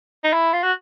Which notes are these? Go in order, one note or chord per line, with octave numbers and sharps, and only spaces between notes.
D#4
E4
F4
F#4